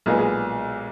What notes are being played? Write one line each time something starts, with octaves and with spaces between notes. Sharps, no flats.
B1 A#2 G#3 B3 G#4
G#4